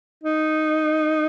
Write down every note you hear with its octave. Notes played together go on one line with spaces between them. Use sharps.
D#4